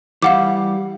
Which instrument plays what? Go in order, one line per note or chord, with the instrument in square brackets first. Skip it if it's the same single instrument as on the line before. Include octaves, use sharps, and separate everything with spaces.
[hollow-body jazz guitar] E3 G3 [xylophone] F5 F#5 D6